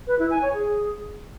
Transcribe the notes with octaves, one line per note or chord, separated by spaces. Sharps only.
B4
E4
G#5
C#5
G#4